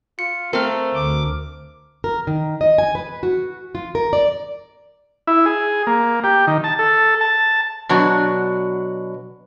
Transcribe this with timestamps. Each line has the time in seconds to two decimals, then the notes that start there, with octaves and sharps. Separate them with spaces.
0.19 F4 C#7
0.53 A3 C4 A#4 F5 F6
0.95 D2 D6
2.04 A#4
2.27 D#3
2.61 D#5
2.78 G#5
2.95 B4
3.23 F#4
3.75 F4
3.95 A#4
4.13 D5
5.27 E4
5.46 G#4
5.87 A#3
6.24 G4
6.47 D#3
6.64 A5
6.79 A4
7.21 A5
7.89 B2 F#3 D4 F#4